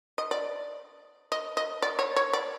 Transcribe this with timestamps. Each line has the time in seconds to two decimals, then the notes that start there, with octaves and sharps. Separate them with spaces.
0.18 D#5
0.31 D5
1.32 D#5
1.57 D#5
1.82 D5
1.99 C#5
2.16 C#5
2.33 D5